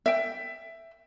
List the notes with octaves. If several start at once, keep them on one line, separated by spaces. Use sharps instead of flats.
E5 G5